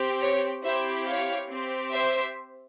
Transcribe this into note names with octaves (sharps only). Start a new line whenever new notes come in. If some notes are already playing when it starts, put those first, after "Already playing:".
Already playing: C4 G4
C#5
C4 E4 G4 C5 E5
C#5 F5
C4 G4
C5 E5